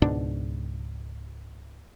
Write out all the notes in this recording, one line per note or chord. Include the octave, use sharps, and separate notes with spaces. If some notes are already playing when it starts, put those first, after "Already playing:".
C#2 G#2 B2 D4